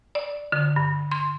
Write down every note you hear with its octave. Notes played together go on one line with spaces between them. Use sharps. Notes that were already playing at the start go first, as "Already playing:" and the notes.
D5
D3
G2
C6